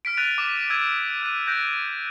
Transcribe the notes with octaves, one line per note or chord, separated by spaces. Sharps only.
F6 B6 D7
F#6 A6 B6 D#7 F7
D6 E7
E6 G#6 D#7 E7
F#6 D#7
F#6 G6 A#6 D7